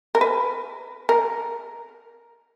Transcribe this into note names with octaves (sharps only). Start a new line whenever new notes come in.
A#4
B4
A#4